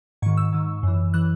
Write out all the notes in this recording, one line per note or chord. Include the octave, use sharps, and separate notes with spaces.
G#2 D#3 C#6
E6
G#2 D#3
F#2 E3
E3 F#6